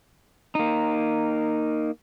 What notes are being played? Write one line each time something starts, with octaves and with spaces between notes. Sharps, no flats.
A#3 D#4